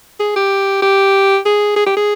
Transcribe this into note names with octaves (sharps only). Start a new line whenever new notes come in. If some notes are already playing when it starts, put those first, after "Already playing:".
G#4
G4
G4
G#4
G#4
G4
G#4